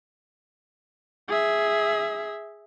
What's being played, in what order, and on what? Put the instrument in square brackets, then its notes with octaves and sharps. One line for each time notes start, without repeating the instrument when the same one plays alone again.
[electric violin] G#4 E5